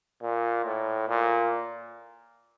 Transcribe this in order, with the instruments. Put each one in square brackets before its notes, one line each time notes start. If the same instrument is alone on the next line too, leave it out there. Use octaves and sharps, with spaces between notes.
[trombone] A#2
A2
A#2